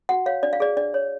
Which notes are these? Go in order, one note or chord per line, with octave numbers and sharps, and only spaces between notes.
F#4 F#5
C#5 F5
D4 D5
F5
G#4 D5
D4 D5
C#5